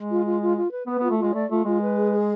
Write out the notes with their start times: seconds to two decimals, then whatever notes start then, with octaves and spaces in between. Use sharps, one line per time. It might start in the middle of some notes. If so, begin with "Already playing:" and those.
Already playing: G#3
0.09 F4
0.25 F4
0.40 F4
0.55 F4
0.71 B4
0.86 B3 B4
0.98 B3
1.02 F4
1.10 A3
1.18 G#3 F4
1.33 A3 D5
1.50 A3 F4
1.65 G#3 F4
1.81 B4
1.96 G#4
2.12 G#4